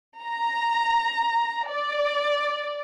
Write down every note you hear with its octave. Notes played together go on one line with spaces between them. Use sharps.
A#5
D5